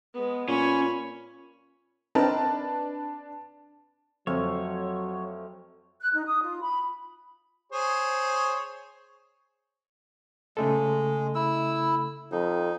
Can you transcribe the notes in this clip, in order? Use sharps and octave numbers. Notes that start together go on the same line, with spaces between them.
G#3 B3
A#2 C#4 C#5 B5
C4 D4 D#4 A#4 B4 A5
F2 F#3 A3 C5 C#5 F5
F#6
D#4
D#6
F4
B5
G#4 C5 C#5
C#3 G#3 A3 A4
E4 E6
F2 D#4